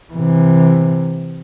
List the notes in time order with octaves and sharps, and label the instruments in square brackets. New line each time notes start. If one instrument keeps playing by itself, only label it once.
[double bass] C3 E3